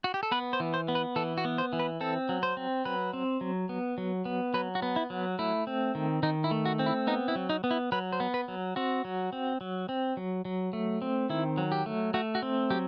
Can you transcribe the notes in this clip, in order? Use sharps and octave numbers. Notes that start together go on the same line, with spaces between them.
F#4
G4
A4
B3 B4
C5
E3
C5
B3
B4
E3 A4
F#4
B3
C5
E3
B4
C4 A4
F#3
C5
C4
F#3 B4
C4
F#3
B3
F#3
B3
F#3 B4
F#4
B3
E4
F#3
A3 E4
C4
D#3
D#3 D#4
E4
A3
F#4
C4
E4
B3 D#4
E4
F#3
D#4
B3
E4
F#3 B4
C5
B3
B4
F#3
C4 F#4
F#3
C4
F#3
C4
F#3
F#3
A3
C4
D#3 E4
F#3
G4
A3
A3 F#4
F#4
C4
F#3 G4